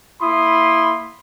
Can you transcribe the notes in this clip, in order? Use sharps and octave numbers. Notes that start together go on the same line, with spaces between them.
A#3 E4 B5 C6 D#6